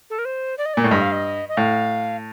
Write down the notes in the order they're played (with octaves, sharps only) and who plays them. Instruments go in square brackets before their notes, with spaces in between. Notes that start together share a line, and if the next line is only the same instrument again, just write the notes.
[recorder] A4
A#4
C5
D5
D#5
[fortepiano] A#2 [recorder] D5
[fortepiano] A2
[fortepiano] G2 [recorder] D#5
[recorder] F5
D#5
D#5
[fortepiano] A2 [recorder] F5